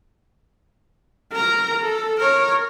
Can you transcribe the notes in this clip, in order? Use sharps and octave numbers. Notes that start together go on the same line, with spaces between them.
A#4 A#5
A4
A#4 C#5